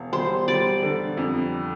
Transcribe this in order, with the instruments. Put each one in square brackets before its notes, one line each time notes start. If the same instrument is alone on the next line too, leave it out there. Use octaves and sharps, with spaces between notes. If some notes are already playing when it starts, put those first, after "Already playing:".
Already playing: [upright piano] E1
[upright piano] G3 [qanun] C5
[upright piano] G3 [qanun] D5
[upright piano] D3
F2